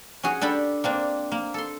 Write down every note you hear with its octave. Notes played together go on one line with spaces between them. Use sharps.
C#4 F#4 G#4
D4 G4 A4 B5
A#3 C4 D4
A#3
A4 C6